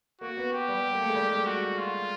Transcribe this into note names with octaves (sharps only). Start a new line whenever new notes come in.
A#3 F#4
B3
G4
G3
A#3
A3
G#3
G3
G#3
F#4
F4